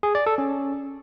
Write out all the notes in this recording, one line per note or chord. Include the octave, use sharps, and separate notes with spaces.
G#4
D5
A4
C#4